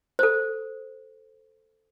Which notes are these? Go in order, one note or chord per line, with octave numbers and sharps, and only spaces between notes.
A4 C5